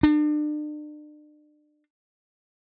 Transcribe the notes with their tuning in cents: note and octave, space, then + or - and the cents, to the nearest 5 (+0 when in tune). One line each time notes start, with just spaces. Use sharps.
D4 +40